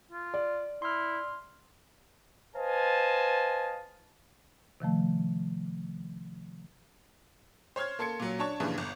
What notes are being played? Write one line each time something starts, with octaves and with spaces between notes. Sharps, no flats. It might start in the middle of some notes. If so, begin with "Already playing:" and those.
F4
D5
E4 C6 F6
B4 C5 D#5 F5 G#5 A5
C3 D#3 F3 A3
C5 C#5 C6 F6 G#6
A#3 A4 C6 G#6 C#7
A#2 F#3
D4 C#5 A5 C#6
G2 A#2 C#3 E3 F3 G3
G1